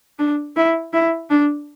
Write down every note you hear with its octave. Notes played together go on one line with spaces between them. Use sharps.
D4
E4
E4
D4